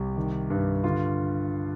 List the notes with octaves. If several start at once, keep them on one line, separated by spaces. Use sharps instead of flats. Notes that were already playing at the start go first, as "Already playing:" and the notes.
Already playing: C2 G4
D#3
G2
D3 F4